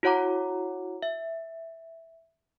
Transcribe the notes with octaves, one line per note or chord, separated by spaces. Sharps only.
E4 F#4 C#5 F#5 A#5 D6
E5